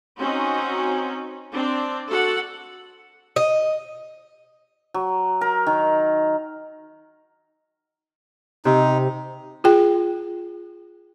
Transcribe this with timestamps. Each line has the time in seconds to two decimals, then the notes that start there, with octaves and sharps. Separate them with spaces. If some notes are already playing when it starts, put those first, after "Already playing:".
0.19 C4 C#4 D#4 F#4
1.53 C4 D4 D5
2.07 F#4 A4 F#5
3.36 D#5
4.94 F#3
5.41 A#4
5.67 D#3
8.65 C3 D#4
9.64 F4 G#4 G5